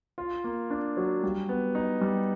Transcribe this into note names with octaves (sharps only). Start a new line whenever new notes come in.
F4
A#3
D4
F#3
G3
B3
D#4
G3